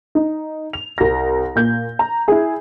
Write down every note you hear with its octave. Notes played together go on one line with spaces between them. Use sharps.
D#4
F7
C2 A#6
A#2 G6
A#5
E4 G#4